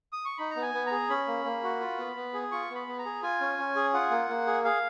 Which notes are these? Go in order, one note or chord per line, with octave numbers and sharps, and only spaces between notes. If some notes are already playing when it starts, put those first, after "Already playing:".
D#6
C#6
D#4 B5
A#5
B3
G#5
B3
G#4 A#5
C#4 B5
A#3
A#3
F#4
F4
B3
B3
G#4
F4 C#6
B3
B5
B3
A#5
G#4
F4 G#5
C#4
C#4
G#4
F4 F#5
A#3
A#3
G#4
G#4 F5